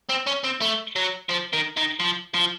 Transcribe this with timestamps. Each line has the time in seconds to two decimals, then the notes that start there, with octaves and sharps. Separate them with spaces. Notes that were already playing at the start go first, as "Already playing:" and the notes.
0.09 C4
0.26 C#4
0.44 C4
0.61 A3
0.96 F#3
1.30 F3
1.53 D#3
1.77 D#3
2.00 F3
2.34 F3